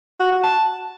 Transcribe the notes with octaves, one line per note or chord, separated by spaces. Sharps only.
F#4
F#4
A5